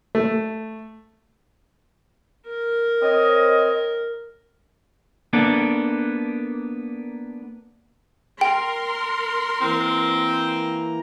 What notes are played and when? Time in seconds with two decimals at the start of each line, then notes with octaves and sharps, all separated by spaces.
0.15 A3
2.47 A#4
3.02 C4 C#5 D#5
5.33 A#3 B3 D4 A4
8.41 A#4 G5 C6
9.61 E3 A#3 C4 A#5